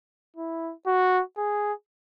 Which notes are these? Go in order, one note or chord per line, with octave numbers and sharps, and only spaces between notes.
E4
F#4
G#4